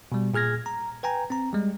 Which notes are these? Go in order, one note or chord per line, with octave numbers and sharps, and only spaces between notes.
B2 G3
A#2 G#4 F6 G#6 A#6
A#5
B4 G5 G#5 A#5
C4 A#5
G3 G#3